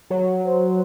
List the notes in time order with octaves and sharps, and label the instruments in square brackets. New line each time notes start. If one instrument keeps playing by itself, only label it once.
[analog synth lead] F#3
[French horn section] C5